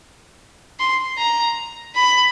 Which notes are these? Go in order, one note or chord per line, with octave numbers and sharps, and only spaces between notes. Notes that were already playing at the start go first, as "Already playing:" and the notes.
C6
A#5
B5